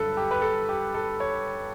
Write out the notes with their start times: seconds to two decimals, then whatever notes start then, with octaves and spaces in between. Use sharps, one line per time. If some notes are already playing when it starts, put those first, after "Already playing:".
Already playing: G2 D3 F#3 A4 B4
0.17 G4
0.31 B4
0.42 A4
0.69 G4
0.94 A4
1.20 C#5